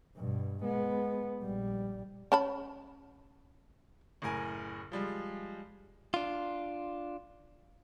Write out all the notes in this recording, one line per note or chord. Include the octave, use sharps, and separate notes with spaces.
G2 B2
G#3 B3
A#1 G3
C#4 A5 B5
F#1 A2 A#4 G#5
F3 G3 G#3
D4 F4